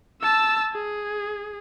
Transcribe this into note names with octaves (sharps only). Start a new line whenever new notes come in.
A5 E6
G#4